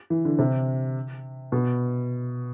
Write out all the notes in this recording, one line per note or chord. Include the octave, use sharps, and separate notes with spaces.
E3
D3
C3
B2